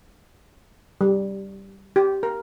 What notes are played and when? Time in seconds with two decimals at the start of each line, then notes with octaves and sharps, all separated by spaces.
1.01 G3
1.96 G4
2.23 A#4